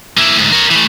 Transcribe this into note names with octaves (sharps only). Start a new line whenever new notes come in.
A#3 E4
D2 G#2
A#4 C#5
E3 A3